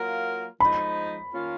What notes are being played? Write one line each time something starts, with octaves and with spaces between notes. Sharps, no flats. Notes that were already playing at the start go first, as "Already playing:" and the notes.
Already playing: F#3 A#3 F4 A#4
F3 G#3 D#4 B5
D#3 A#3 C#4 F4